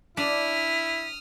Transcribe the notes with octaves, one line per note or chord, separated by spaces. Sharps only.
D4 E4 D#6 F6 B6